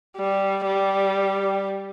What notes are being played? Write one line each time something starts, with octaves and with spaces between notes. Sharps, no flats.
G3
G3